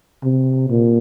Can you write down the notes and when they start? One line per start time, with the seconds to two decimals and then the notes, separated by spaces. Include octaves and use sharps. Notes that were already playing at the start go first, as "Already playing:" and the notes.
0.24 C3
0.70 A#2